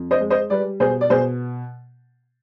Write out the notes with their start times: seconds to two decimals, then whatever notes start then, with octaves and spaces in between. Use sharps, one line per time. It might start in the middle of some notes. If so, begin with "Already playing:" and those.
Already playing: F2
0.11 C5 D#5
0.20 G#3
0.30 C5 D#5
0.50 G3 B4 D5
0.80 B2 G#4 C5
1.01 D5
1.10 B2 G#4 C5